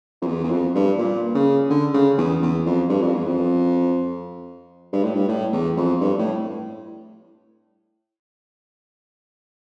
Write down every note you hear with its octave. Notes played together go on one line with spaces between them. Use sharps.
F2
E2
E2
F2
G2
A#2
C#3
D3
C#3
E2
E2
F2
G2
F2
E2
F2
G2
A2
G2
A2
E2
F2
G2
A2